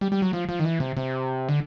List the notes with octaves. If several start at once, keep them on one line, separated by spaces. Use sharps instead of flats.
G3
G3
F#3
F3
F3
D#3
E3
C3
C3
D3